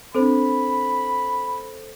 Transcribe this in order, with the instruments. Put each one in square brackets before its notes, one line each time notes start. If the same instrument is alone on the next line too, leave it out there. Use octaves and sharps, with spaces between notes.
[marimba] C4 D4 [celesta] A4 C5 [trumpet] B5